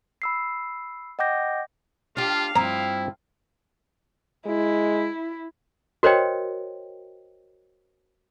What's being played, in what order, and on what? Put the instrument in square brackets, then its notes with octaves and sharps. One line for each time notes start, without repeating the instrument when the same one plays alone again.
[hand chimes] B5 E6 C7
D#5 F#5 G5 D6 G6 A#6
[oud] D4 G4 [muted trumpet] F4 [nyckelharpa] F5
[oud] G2 F3 C4 [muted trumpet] E4 [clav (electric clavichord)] A#5
[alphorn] G#3 [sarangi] E4
[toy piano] F#4 A#4 C5 C#5 D#5 G5